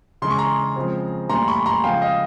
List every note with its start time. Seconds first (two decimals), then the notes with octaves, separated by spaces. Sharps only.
0.22 C#3 E3 G#3 C6
0.30 C#6
0.39 A#5 C6
0.76 C#3 F3 G#3 C4
1.29 A2 E3 G3 A#3 A#5 C6
1.48 B5 C#6
1.66 A#5 C6
1.84 C#3 F3 G#3 B3 F5 G5
2.02 D#5 F5